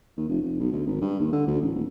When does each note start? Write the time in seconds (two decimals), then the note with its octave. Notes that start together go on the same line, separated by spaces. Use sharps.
0.17 D#2
0.29 F1
0.42 F1
0.59 B1
0.72 D2
0.87 G#1
1.02 G2
1.20 D#2
1.33 D3
1.47 D2
1.61 A1
1.76 D#1